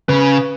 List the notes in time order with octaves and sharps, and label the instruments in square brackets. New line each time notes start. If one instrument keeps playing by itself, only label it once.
[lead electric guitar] C#3 [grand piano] B4